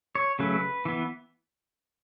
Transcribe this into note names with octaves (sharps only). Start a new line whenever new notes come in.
C#5
C#3 F#3 A3 C#4 B4
E3 B3